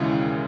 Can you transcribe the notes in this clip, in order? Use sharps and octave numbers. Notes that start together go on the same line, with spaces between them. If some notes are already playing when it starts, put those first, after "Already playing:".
Already playing: E1 D#2 C#3 E3 G#3